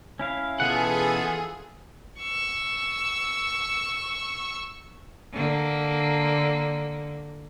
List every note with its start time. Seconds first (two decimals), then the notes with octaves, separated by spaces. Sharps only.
0.19 C#4 E4 F5
0.60 B2 E3 B3 F4 G#4 A4 F#5
2.19 C#6 E6
5.32 D3 A#3